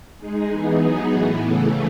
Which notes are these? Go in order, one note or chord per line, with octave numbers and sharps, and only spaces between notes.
G#3 D#4 G#4
E3 B3 D#4 G#4
F#3 B3 D#4 G#4
A2 E3 B3
C#3 E3 A3